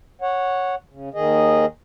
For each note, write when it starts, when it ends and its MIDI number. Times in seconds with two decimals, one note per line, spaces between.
0.21 0.75 73
0.21 0.75 78
0.89 1.09 49
1.14 1.66 39
1.14 1.66 51
1.14 1.66 68
1.14 1.66 75